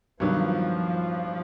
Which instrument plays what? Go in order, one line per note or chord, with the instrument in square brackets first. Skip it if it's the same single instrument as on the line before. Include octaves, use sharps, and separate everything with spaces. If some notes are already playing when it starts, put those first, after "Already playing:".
[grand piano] G2 D#3 F#3 B3 [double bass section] F3